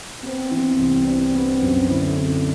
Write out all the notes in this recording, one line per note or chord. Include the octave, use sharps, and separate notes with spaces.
B3 C4
E3
C2
C4 D4
B3
F#2
D3 E4
C4